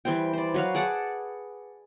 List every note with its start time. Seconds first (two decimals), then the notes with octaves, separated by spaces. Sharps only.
0.05 E3 G3 C5 G5
0.33 C5 D5
0.54 F#3 B4 F5
0.75 G#4 D5 F#5 A5